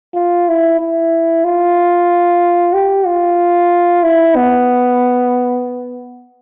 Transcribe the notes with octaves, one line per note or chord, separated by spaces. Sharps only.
F4
E4
E4
F4
G4
F4
E4
B3